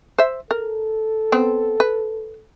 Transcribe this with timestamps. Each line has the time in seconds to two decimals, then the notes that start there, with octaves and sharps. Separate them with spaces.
0.18 C5 E5
0.51 A4 A#4
1.32 B3 C4
1.80 B4